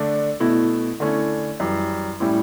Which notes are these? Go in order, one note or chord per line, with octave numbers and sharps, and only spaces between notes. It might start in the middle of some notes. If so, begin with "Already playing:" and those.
Already playing: D3 A3 D4
B2 A3 E4
D3 A3 C#4 E4
F#2 E3 G3
A2 G3 C#4 E4